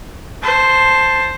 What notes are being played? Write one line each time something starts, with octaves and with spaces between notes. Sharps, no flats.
C5 A5